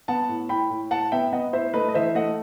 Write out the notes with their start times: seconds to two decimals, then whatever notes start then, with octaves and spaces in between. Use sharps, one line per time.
0.08 B3 F#5 A5
0.29 A2
0.49 A2 G5 B5
0.70 A2
0.91 A2 F#5 A5
1.12 B3 E5 G5
1.33 B3 D#5 F#5
1.53 A2 C5 E5
1.74 A3 B4 D#5
1.89 D#5
1.94 E3 C5 E5
2.15 A3 D#5 F#5